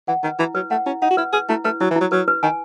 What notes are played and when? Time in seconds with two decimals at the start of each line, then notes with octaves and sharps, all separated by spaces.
0.08 E3 F#5
0.24 D#3 B4
0.39 E3 E4
0.55 F#3 B4
0.71 A3 F#5
0.86 C#4 E4
1.02 D#4 F#5
1.10 F#4
1.17 E4 B4
1.33 G#4 B4
1.49 A3 E4
1.64 A3 B4
1.81 F#3 E4
1.91 E3
1.96 F#3 E4
2.12 F#3 B4
2.28 B4
2.43 D#3 G#5